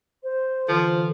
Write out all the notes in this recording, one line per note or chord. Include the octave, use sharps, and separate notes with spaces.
C5
D3 E3 F3